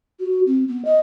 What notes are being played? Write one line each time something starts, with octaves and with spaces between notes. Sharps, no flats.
F#4
C4
B3
D#5